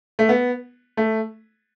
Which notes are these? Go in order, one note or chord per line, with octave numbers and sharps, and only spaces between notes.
A3
B3
A3